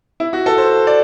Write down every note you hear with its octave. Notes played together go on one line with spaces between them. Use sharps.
E4
F#4
A4
C5
D5